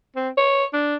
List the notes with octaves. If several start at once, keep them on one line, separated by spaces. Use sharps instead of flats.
C4
C#5
D4